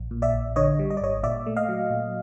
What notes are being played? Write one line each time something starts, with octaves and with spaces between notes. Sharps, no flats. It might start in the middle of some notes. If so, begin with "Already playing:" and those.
Already playing: A#1
A#2
D5 E5
A#1
D3 C#5 D#5
G3
D#5
D5
G#1 C#5 D#5
A#2 D5 E5
A3
D#5 F5
F#3
A#2